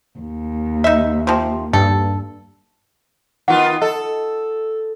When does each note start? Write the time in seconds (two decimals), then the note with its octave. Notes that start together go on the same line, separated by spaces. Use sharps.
0.19 D#2
0.84 D#4 E5
1.27 C3 F3
1.73 G2 A4
3.48 D#3 B3 F4 F#5
3.82 A4 D#5